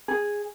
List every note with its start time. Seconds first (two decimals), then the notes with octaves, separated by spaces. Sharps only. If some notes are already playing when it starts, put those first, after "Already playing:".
0.08 G#4